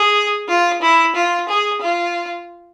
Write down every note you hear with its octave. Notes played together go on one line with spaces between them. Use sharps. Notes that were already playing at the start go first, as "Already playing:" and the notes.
Already playing: G#4
F4
E4
F4
G#4
F4